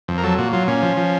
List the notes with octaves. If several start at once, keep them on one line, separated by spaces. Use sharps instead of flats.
F2
A#4
F#3 A4
A#2 F#4
F#3 F4
A#2 C#4
F3
F3